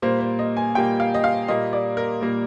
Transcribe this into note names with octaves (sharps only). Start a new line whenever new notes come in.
A#2 G3 A#3 C5
C5
D#5
G#5
A#2 G3 A#3 G5
F5
D#5
F5
A#2 G3 A#3 D#5
D5
A#4
A#2 G3 A#3